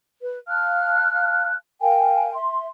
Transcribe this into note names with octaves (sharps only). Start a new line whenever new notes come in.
B4
F5 A5 F6 F#6
A#4 F5 G5 G#5
E5 C6